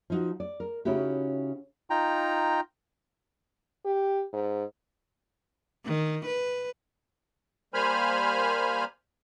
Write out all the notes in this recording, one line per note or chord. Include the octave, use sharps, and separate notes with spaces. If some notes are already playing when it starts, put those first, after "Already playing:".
F3 D#4 F#4
D5
A#4
C#3 C#4 D#4 E4 F#4 G4
D#4 F4 G5 A#5
G4
G#2
D#3
B4
G3 A#3 C5 G#5 B5 F6